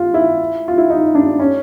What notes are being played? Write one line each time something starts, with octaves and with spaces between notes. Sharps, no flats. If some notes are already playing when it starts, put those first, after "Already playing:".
Already playing: F4
E4
F4
E4
D#4
D4
C#4